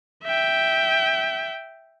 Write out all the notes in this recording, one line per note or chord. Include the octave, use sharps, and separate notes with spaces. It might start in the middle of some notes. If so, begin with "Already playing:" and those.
E5 G5